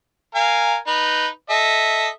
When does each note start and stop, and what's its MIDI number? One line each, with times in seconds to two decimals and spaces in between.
0.35 0.76 70
0.35 0.76 77
0.35 0.76 80
0.87 1.27 63
0.87 1.27 71
1.50 2.09 69
1.50 2.09 75
1.50 2.09 76